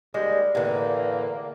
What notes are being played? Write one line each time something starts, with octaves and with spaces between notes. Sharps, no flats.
D#2 G3 G#3
E2 A2 D3 A#3